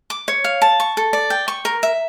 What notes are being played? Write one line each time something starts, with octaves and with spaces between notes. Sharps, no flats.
D6
C#5
F5
A5
C#6
A4
D5
G5
C#6
A#4
E5